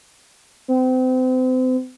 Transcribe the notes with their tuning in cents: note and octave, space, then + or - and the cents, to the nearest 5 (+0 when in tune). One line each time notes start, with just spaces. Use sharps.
C4 -35